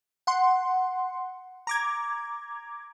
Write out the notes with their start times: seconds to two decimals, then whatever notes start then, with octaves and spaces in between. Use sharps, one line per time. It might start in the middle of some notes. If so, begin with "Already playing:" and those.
0.27 F#5 C6
1.67 A#5 D6 G#6